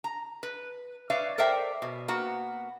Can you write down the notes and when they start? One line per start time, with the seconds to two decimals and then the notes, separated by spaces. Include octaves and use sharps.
0.04 A#5
0.43 B4
1.10 B4 C#5 D5 E5 F5
1.38 A4 A#4 C5 D5 E5 G5
1.82 B2
2.08 A#3 B3 F#4